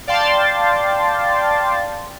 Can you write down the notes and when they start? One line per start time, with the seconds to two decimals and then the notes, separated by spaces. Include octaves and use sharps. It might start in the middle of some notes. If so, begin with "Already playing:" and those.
0.07 D5 F5 G5 A5 C6 A6